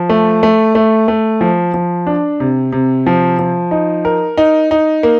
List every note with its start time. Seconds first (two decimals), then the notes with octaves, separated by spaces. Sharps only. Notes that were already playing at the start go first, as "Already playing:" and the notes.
Already playing: F3
0.09 A3
0.43 A3
0.75 A3
1.08 A3
1.41 F3
1.74 F3
2.07 D4
2.40 C3
2.72 C3
3.06 F3
3.39 F3
3.71 D#4
4.05 A#4
4.37 D#4
4.71 D#4
5.03 A#3